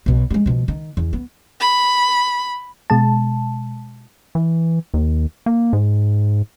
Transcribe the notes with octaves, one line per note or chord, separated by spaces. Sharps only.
B1 B2
G3 G#3
B2 F3
D#3
E2
B3
B5
B2 G#3 A5
E3
D#2
A#3
G#2